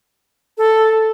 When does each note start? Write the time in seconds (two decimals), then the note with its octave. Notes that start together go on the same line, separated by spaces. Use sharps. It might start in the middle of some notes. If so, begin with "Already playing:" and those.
0.58 A4